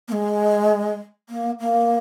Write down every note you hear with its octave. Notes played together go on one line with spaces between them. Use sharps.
A#3
G#3
A#3
A#3